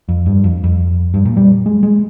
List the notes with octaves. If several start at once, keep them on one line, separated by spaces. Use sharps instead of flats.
F2
G2
F2
F2
G2
A#2
G3
G#3
G#3